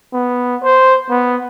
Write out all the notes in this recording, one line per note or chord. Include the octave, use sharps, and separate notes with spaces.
B3
C5
B3